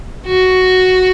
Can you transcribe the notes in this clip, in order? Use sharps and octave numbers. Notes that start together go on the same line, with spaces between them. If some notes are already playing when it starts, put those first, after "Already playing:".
F#4